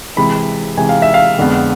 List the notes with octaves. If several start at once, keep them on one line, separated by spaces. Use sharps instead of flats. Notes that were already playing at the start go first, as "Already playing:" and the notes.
C3 E3 G#3 B5
C3 E3 G#3 G#5
F5
E5
F5
F2 D3 G#3 B3